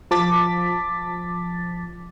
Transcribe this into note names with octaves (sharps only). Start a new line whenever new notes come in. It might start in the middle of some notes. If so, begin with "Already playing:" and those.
F3 A5 D6 A6 B6